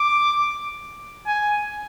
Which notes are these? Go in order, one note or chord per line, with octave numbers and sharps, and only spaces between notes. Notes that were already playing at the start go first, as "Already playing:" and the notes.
Already playing: D6
G#5